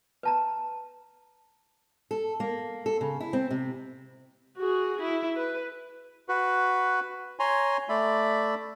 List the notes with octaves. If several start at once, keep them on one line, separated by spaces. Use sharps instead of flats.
B4 A5 A#5
A4
A#3
A4
C#3
E4
C4
C3
F#4 G#4
E4
B4
F#4 B4
C#5 G#5 A#5 C6
A3 D5 E5 B5